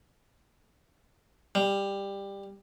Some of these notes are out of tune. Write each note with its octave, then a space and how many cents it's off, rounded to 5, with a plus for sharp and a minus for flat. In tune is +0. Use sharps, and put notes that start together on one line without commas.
G3 +15